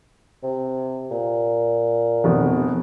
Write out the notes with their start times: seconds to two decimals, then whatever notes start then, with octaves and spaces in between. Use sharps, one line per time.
0.43 C3
1.11 A#2
2.24 F1 B2